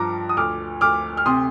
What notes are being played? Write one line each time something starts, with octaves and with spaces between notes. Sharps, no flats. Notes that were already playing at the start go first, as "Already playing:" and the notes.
Already playing: G2 F3 A#5 D6
D#6
D2 D6 F6
D2 D6 F6
F6
C3 C6 D#6